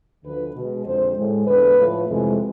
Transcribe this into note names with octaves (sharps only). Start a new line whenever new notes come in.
D2 D3 F3 B4
B2 G#3
F2 D3 G#3 C5
A2 G#3
E2 D3 A3 B4
A2 F3 A3
F2 C3 E3 G#3